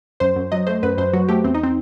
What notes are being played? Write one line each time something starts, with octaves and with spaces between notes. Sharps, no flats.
F#2 C5
F#2
F#3 D#5
A3 C5
F#2 B4
F#2 C5
F#3 F#4
A3 G4
E2 C4
D#4
C4